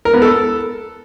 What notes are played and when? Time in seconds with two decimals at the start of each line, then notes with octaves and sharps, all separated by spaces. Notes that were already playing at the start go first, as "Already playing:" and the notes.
0.05 A#4
0.14 B3
0.22 A4